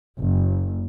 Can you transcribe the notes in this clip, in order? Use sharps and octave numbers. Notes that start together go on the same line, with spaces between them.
F#1